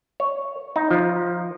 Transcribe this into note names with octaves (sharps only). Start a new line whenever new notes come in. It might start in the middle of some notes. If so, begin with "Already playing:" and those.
C#5
D#4
F3